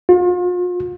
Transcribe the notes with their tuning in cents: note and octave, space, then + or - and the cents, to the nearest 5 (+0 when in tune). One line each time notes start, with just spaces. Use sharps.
F4 +40